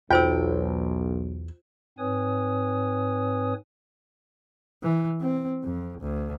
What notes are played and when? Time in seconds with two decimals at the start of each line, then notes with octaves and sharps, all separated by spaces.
0.10 B1 E2 F4 C5 G5 E6
1.98 G#2 C4 B4 C#5 G#5 D#6
4.82 E3
5.20 C4
5.64 F2
6.00 D2